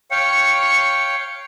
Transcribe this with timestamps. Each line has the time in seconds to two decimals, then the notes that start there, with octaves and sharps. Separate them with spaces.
0.11 C#5 F5 G5 C#7